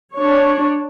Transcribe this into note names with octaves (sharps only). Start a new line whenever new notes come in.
D4 C#5